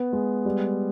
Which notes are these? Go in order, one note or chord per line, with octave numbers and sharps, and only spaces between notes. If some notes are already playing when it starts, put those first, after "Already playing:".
Already playing: B3
G#3
G3